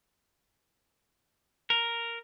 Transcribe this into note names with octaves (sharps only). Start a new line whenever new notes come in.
A#4